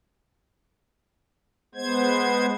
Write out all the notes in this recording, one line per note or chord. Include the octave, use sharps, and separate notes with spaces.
G#3 B3 C5 G#6